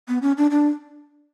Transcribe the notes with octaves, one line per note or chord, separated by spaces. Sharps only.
B3
C#4
D4
D4